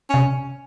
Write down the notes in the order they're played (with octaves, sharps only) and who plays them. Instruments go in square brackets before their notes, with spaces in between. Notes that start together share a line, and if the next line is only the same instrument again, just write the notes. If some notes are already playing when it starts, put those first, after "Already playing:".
[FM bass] C3 [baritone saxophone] C#4